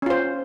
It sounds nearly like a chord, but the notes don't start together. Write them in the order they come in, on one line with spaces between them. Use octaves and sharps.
C#4 F4 C5